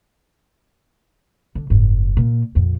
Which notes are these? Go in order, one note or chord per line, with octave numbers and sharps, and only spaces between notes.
D3
F#1 G#2
A#2
A#1 F2